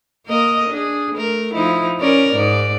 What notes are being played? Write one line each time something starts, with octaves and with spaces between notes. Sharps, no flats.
A#3 A#4 D#5
D4 G#4
A3 A#4
F3 D#4 E4
C#4 A#4 D5
G#2 D5